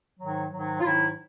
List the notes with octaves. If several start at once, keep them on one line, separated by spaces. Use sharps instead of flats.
G#2 D#3 F#3
G#2 D#3 F#3
F4
G#2 D#3 F#3 E4